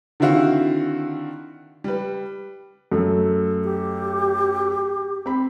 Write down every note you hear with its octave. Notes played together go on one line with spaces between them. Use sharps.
D3 D#3 C4 E4 F#4 F5
G3 B4
F#2 A3
G4
C4 B5